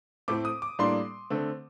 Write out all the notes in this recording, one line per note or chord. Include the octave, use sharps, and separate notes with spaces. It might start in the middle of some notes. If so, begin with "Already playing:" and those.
A2 A3 C4 D6
D#6
D6
A2 G3 A#3 D4 C6
D3 A3 C4